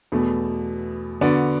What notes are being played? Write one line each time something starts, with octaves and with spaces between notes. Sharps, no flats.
E2 B2 A3
D3 B3 F#4 D5